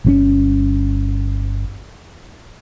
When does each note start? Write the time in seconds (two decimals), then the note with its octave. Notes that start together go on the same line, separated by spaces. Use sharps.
0.04 G1 C3 C#4